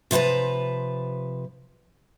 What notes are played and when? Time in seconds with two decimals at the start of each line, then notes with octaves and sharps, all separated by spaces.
0.11 C3 F3 B4 A5 A#5